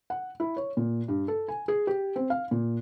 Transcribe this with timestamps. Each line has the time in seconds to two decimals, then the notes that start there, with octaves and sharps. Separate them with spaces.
0.10 F#5
0.40 E4
0.57 C#5
0.77 A#2
1.08 G2
1.28 A4
1.48 G#5
1.68 G#4
1.87 G4
2.16 C4
2.30 F5
2.51 A#2